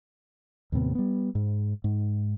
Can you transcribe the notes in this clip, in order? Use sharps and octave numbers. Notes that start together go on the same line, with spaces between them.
D#2 A2 C3 B3
G3 B3
G#2
G#2